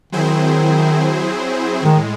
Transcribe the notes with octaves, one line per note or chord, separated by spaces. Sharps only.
D#3 F#3 C4 E4 G#4 C5
A2 D#3 G#3